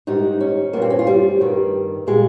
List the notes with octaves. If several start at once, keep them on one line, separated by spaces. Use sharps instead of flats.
G#2 D#3 G3 D#4
C#4
G2 F3 A#3
C4
C#4
F4
G3
G2 D#3 G3
A#2 G3 G#3